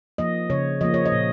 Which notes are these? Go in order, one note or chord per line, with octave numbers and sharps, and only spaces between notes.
F3 A#3 D#5
C#3 C#5
F3 A#3 D#5
C#5
D#5
A#2